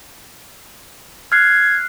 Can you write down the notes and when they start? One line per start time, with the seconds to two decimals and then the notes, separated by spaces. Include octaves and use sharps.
1.32 F6 F#6 G#6 C7